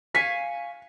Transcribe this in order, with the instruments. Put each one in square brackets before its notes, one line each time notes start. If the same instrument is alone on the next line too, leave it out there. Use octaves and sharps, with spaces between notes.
[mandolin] F5 G#5 C#6 [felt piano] B6